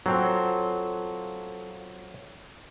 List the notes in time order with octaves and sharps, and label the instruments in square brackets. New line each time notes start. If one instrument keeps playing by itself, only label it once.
[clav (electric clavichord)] F#3 C4 [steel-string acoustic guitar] F4 A4